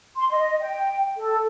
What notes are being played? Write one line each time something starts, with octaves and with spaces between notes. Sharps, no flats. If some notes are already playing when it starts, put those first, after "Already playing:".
C6
D#5
G5
A4